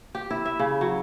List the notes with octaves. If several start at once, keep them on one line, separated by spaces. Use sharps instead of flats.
G4
E4
E5
C#3
F#3